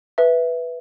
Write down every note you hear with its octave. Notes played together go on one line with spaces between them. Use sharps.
B4 E5